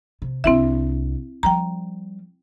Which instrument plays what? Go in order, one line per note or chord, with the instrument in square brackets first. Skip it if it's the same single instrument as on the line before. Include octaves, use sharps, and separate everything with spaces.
[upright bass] C3
[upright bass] C2 D4 [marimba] C4 E4 E5
[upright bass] F3 G3 [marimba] G5 A#5